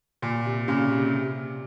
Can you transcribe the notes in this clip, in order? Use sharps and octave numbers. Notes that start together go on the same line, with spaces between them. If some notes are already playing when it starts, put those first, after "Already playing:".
A#2
C3
A#2 C#3
C3
C3
C3